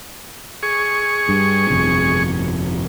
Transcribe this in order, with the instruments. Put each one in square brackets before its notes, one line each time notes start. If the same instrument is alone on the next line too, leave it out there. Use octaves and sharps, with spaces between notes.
[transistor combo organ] G#4 C#6
[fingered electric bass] G2
G1 F2 C3